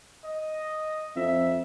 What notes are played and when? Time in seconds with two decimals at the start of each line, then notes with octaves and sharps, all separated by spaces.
0.24 D#5
1.16 F2 E5